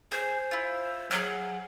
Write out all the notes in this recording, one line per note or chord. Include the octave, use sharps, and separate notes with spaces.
G#4 C5
E4 F4
F#3 G#4 F#5 F6